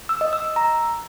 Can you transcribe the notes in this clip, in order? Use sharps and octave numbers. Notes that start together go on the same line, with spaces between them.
E6
D#5
E6
E6
A#5